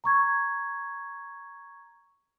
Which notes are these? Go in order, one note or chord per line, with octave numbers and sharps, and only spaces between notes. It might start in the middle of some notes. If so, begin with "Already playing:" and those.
A#5 C#6 G#6